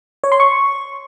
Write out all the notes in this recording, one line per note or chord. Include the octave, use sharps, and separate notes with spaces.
C#5
C6
C#6